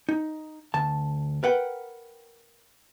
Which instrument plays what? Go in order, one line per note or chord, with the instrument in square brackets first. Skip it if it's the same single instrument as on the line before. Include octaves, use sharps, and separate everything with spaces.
[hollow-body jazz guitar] D#4
D2 A5
A#4 B4 F#5 G5